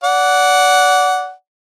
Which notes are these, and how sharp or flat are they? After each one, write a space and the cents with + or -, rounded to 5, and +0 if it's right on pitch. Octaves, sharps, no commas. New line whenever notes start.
D5 -25 F#5 +0